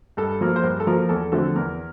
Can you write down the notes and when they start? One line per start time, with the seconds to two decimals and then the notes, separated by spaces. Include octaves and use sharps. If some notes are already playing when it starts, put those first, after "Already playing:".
0.17 G2 A4
0.41 F3 A#3
0.56 C5
0.63 G2 A#4
0.80 A4
0.87 F3 A#3 A#4
1.02 A#4
1.09 E2 A4
1.32 D3 F3 A3 C4 A4
1.55 E2 A#4